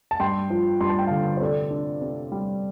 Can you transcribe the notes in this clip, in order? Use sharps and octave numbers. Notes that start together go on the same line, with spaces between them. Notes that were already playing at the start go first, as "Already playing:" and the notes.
A5
G2 G5 C6
F3
G2 C6
A5
G5
D3 F5 A5
C5
C3 A4 D5
D4
C3
G3